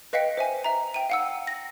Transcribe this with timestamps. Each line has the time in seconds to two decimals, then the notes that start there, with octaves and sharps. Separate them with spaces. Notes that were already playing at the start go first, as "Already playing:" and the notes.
0.13 B4 D#5 F5 G5 B6 C#7
0.37 C5 E5 G#5
0.64 E5 A#5
0.94 G5 D#7
1.10 F5 F#5 E6
1.47 A#6